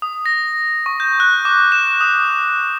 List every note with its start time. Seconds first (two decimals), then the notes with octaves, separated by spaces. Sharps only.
0.02 D#6
0.26 A#6
0.86 C#6
1.00 G6
1.20 F#6
1.45 D6
1.72 E7
2.01 D#6